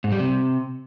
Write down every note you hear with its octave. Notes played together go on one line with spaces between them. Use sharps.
G#2
G3
C3